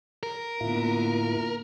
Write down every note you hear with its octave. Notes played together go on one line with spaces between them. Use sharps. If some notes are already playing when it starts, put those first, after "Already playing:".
A#4
A2 D3 A#3 B3 E4 F4